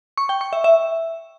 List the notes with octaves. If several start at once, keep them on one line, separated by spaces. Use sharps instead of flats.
C#6
G5
C#6
E5
E5